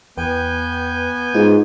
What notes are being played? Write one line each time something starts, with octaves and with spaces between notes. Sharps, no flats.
E2 B3 B4 G5 G#5 G6
G#2 F4